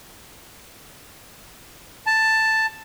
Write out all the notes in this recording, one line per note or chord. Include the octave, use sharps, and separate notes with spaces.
A5